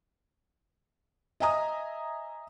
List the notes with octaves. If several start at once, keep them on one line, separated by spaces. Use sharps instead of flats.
D#5 E5 G#5 A#5 D#6